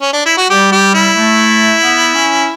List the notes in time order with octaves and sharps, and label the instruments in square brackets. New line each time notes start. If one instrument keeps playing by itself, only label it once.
[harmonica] C#4
D4
E4
F#4
[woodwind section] G3 [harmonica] G4
[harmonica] G4
E4
[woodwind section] A3
B3
C#4